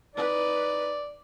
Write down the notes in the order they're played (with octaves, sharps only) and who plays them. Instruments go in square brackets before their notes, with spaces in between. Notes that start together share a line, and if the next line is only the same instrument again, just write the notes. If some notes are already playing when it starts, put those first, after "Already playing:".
[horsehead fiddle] D#4 B4 [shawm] D5